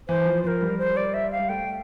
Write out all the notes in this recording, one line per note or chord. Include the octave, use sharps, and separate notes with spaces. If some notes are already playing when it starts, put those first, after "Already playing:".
E3 C5
F3
F3 A#4 C5
G3
C5
D5
E5
F5
G3
A3 G5